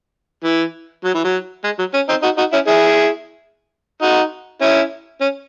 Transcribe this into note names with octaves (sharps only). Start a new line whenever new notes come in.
E3
F#3
E3
F#3
G#3
F#3
C#4
C4 D#4
D#4 F#4
D#4 F#4
C#4 E4
E4 G#4
D#4 F#4
C#4 E4
C#4